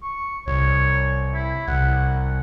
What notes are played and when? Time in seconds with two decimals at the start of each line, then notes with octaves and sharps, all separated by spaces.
0.02 C#6
0.47 C2 C#5
1.34 E4
1.68 C2 F#5